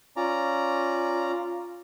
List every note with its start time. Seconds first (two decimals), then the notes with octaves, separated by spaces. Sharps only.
0.16 C#4 F4 D5 A#5